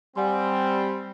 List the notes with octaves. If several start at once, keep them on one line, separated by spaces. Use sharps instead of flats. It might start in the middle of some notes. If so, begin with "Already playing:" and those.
G3 C4 F#5 G#5 C6